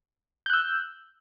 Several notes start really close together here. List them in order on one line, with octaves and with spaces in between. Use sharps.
G6 F#6 E6